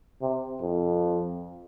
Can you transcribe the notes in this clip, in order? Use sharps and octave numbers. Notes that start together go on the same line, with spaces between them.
C3
F2